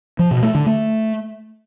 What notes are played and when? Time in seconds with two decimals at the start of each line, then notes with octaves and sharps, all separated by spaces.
0.19 F3
0.31 B2
0.43 A3
0.55 D3
0.66 A3